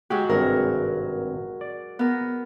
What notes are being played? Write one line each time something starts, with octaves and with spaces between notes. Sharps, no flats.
F#3 G#3 F#4 G4
G#1 G2 C3 A#4
D5
B3 A#4